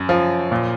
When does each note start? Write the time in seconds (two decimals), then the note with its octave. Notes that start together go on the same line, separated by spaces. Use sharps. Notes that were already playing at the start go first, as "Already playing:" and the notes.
Already playing: F#2
0.09 F3
0.52 A#2